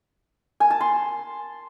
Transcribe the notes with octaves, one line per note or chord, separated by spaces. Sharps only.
G#5
A5
C6